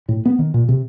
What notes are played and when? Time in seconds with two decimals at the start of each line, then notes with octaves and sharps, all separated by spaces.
0.09 A2
0.25 B3
0.39 D#3
0.54 A#2
0.69 C3